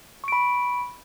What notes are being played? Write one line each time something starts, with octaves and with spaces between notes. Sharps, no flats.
B5 C#6 D7